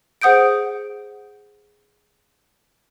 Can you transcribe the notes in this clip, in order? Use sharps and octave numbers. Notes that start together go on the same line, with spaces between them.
G#4 C5 F#5 D#6 G6 D7